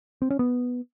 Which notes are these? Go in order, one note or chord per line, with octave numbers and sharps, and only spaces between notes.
C4
C#4
B3